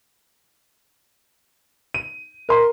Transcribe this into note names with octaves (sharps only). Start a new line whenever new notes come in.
D#7
A#4 C6